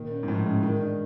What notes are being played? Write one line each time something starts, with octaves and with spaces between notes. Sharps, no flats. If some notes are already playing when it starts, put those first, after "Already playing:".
Already playing: A#2 D#3 A#3
C#4
G#2
A2 F3
C#3 G#3
D#3 E3
D4